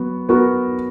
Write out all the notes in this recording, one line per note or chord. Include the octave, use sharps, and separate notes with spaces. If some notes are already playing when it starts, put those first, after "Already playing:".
Already playing: F#3 B3 F#4
B3 F#4 A#4